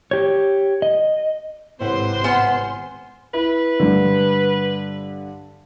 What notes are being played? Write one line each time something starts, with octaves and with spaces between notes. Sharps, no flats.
G4 C#5
D#5
G#1 A2 C3 B4 C5 F#5 C6
B3 F#5 G#5 F6
E4 B4
G2 D3